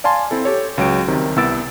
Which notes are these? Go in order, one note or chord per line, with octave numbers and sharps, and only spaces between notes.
D5 F5 G#5 A5 C6
C4 E4 A4
G4 A4 C#5
C#2 F#3 G5 D7
C2 C3 D#3
C2 B3 E4 E6 A6 D7